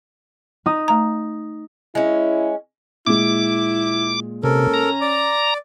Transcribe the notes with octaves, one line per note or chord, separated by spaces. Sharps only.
D#4 D#6
A3 A#5
G#3 C#4 E4
A#2 G#3 E4 D6
C3 C#4 A4 A#4
A#5
D5 D6